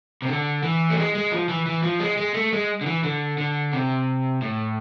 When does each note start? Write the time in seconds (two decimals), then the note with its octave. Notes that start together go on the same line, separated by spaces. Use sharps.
0.22 C3
0.29 D3
0.63 E3
0.90 A3
0.97 G#3
1.15 G#3
1.32 F3
1.49 E3
1.66 E3
1.83 F3
2.00 G#3
2.17 G#3
2.34 A3
2.53 G#3
2.81 D3
2.86 E3
3.04 D3
3.38 D3
3.73 C3
4.42 A2